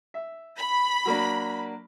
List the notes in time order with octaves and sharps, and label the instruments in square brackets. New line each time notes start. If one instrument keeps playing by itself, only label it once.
[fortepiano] E5
[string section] B5
[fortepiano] F#3 A#3 D4